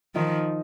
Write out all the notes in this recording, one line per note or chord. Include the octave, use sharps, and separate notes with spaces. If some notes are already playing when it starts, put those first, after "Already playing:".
D#3 F3 D#4